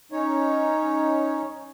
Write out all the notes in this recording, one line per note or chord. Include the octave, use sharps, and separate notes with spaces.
C#4 D#4 C#5